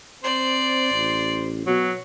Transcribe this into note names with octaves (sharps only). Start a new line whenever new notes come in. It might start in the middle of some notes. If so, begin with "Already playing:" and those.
C4 C5 D5
A1
B2 F#3